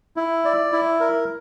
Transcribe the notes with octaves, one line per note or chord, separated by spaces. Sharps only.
E4
D5
E4
A#4